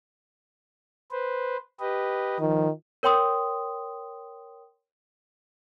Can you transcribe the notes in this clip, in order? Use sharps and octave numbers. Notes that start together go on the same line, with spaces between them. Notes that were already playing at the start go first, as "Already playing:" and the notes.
B4 C5
G4 B4 D#5
D#3 F3
A#4 C#5 G5 C6 D#6